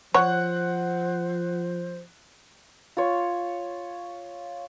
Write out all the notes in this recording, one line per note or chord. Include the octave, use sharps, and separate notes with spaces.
F3 C5 C#5 F#5 F#6
F4 C#5